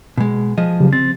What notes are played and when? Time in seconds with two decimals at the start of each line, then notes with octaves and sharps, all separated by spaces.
0.18 B2 G#3
0.58 F3 G#4 D#5
0.80 C#3 F#3 G4
0.93 C4 A6